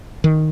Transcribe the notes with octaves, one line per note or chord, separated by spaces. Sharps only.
D#3